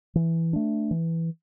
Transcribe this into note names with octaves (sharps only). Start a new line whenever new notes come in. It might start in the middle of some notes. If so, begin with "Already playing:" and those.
E3
A3 D4
E3